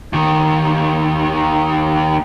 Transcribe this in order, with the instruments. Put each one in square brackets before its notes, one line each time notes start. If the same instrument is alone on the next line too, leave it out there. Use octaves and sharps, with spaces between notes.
[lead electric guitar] D#2 D#3